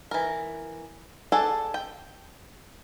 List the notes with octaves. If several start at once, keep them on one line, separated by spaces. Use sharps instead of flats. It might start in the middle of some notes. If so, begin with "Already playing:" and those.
E3 A#4
G#4 A4 D5 F#5
G5